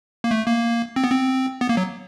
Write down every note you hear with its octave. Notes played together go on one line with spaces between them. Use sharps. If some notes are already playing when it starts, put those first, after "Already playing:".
A#3
A3
A#3
C4
B3
C4
B3
A#3
F#3